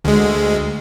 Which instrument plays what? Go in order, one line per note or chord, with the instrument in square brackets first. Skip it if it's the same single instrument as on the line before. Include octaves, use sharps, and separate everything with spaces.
[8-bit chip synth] D2 G#3